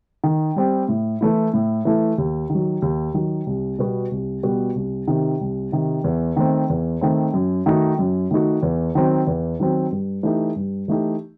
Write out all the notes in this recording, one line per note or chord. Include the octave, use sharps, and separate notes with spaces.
D#3
G3 C4
A2
E3 A3 E4
A2
E3 A3 E4
D#2
D#3 F#3
D#2
D#3 F#3
C2
B2 G3 B3 F#4
C2
B2 G3 B3 F#4
C2
C3 D#3
C2
C3 D#3
E2
D#3 A3 C4
E2
D#3 A3 C4
F#2
D#3 A3 D#4 F#4
F#2
D#3 A3 D#4 F#4
E2
D#3 F#3 C4
E2
D#3 F#3 C4
G2
E3 A3 D#4 G4
G2
E3 A3 D#4 G4